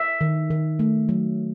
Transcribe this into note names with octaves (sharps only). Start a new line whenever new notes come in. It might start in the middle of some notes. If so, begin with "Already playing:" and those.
Already playing: E5
D#3
D#3
A3
F#3